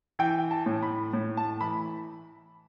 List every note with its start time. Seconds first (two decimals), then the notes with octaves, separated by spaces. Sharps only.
0.19 E3 G5
0.51 A5
0.66 A2
0.83 B5
1.13 A2
1.37 A5
1.61 E3 B5